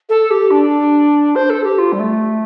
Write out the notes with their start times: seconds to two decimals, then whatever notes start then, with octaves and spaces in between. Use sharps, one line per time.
0.09 A4
0.30 G4
0.50 D4
1.35 C5
1.49 A4
1.63 G4
1.78 F4
1.92 G3
1.99 A3